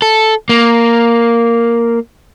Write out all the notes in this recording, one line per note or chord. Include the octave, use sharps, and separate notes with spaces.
A4
A#3